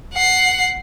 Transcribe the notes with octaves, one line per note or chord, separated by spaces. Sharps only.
F#5 C7